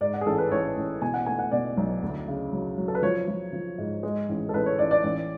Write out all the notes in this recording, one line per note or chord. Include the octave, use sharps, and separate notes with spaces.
G#2 D5
F#5
G#4
A1 A4
B4
A1 C#5
A1
B2 G#5
F#5
A3 G#5
F#5
B2 D5
B1
D2
C#3
F#3
F#3
A4
B4
F3 C#5
F3
F3
G#2
G#3
A1
A4
A1 B4
C#5
A1 D5
D5
A1